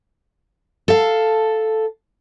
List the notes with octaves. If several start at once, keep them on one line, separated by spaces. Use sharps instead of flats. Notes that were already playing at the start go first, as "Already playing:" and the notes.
A4 F5